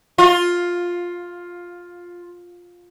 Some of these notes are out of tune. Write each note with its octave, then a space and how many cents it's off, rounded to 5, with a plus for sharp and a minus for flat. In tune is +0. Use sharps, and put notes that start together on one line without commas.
F4 +10